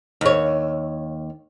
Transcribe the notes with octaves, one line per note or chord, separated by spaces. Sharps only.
D#2 C#5